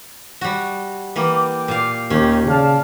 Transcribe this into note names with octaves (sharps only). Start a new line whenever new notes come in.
G3 F#4
E3 A#3 G5 D6
A#2 F5
D#2 C#4 G4
C#3 D5 F5 A5